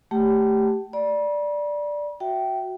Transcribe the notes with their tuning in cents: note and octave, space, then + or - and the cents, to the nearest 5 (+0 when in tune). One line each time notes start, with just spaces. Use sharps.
A3 +0 G4 +0 G5 -45
D5 +0 B5 -45
F#4 +0 E5 +10 G5 -15